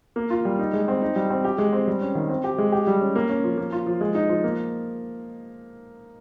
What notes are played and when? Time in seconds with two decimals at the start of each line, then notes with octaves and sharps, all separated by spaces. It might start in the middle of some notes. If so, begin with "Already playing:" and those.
0.16 A#3
0.30 F4
0.45 G3
0.59 D#4
0.73 G#3
0.88 C4
1.02 D#4
1.16 G3
1.30 C4
1.44 G4
1.58 G#3
1.73 C4
1.87 G3
2.01 C#4
2.15 D#3
2.29 C4
2.44 G4
2.58 G#3
2.72 G4
2.87 G3
3.01 C#4
3.16 A#3
3.29 C#4
3.44 F3
3.57 A#3
3.72 F4
3.86 F3
4.01 G#3
4.15 D#4
4.29 F3
4.44 A#3